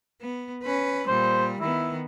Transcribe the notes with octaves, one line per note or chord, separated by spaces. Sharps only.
B3
C#4 B4
A#2 G3 C5
D#3 B3 E4